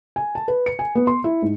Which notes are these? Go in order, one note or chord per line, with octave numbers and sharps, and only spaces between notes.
G#5
A5
B4
C#7
G#5
B3
C6
E4
G#2